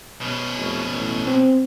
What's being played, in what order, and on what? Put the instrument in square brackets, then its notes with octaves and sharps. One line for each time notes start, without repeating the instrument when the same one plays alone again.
[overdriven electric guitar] B2 C#4
[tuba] F1
A1
C4